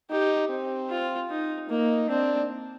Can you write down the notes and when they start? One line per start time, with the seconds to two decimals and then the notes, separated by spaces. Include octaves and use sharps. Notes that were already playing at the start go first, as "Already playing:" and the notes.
0.10 D#4 G4
0.49 C4
0.89 F4
1.30 D#4
1.69 A#3 D#4
2.09 C4 D4